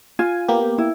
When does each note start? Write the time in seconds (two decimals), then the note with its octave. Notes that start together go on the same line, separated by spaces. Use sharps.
0.19 F4 G#5
0.48 A#3 B3 G4
0.78 E4